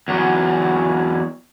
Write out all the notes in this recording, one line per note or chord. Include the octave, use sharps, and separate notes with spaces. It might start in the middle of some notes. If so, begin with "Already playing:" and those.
E2 F#3